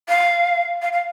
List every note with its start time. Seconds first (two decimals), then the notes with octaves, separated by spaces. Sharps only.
0.08 F5
0.82 F5
0.92 F5